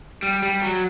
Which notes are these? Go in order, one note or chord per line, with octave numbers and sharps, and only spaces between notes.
G3
G3
F#3